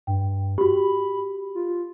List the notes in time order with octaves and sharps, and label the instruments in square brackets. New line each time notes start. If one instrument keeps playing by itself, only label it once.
[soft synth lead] G2 [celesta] G5
[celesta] F#4 G4 [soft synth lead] B5
[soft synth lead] F4